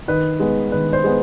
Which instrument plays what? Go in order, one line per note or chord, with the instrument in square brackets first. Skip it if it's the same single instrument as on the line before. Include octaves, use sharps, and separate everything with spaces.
[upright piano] D#3 B4
G#3 B3
D#3 B4
C5
G#3 B3